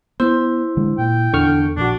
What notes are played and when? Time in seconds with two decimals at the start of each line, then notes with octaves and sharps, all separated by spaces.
0.20 B3 E4 C5
0.77 D3 G#3
0.98 A#2 G5
1.33 E2 D3 C#6 F6
1.77 A#1 D4 F#4